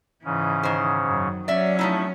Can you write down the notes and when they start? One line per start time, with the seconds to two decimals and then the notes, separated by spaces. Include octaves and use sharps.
0.25 G#2 C#3 E3 C#4
0.63 D#3 C5
1.05 F#2
1.48 F#3 C#4 D5 E5
1.79 F3 A3 D#4 E4